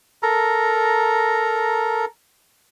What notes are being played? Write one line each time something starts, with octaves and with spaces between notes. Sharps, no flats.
A4 A#4 A#5